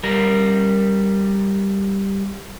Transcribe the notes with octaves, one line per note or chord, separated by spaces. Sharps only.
G3 A#4